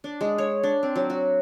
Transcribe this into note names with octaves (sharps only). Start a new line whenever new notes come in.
D4
G#3
C#5
D4
C4
F#3
F#4